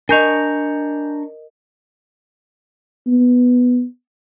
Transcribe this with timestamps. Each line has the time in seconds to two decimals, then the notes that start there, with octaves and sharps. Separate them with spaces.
0.09 D4 A#4 D#5 G#5 A#5 C#6 G6 F7
3.07 B3